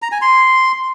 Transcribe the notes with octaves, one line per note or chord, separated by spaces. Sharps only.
A#5
G#5
C6